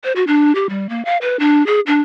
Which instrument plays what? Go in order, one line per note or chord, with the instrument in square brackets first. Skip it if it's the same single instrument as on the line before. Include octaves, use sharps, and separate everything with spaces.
[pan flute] C5
F#4
D4
G4
G3
A#3
F5
B4
D4
G#4
D4